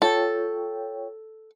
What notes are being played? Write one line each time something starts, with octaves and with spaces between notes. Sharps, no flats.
F4 A4 C#5 G5